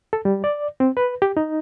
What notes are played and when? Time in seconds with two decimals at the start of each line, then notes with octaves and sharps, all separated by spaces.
0.13 A4
0.25 G3
0.44 D5
0.80 C4
0.97 B4
1.22 G4
1.37 D#4